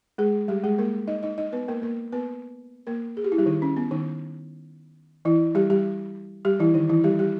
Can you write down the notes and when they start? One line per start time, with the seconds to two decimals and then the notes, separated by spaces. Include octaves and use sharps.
0.18 G#3 G#4
0.48 G3 G4
0.64 G#3 G#4
0.78 A#3 A#4
1.08 D#4 D#5
1.23 D#4 D#5
1.38 D#4 D#5
1.53 B3 B4
1.68 A#3 A#4
1.82 A#3 A#4
2.12 B3 B4
2.87 A#3 A#4
3.17 G#4
3.24 G4
3.32 E4
3.38 G3 G4
3.46 D#3 D#4
3.62 C#4
3.77 B3
3.91 D#3 D#4
5.25 E3 E4
5.55 G3 G4
5.70 G3 G4
6.45 G3 G4
6.60 E3 E4
6.74 D#3 D#4
6.89 E3 E4
7.04 G3 G4
7.19 G3 G4